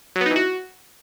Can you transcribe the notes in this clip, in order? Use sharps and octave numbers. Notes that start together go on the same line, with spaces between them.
F#3
B3
D#4
E3
F#4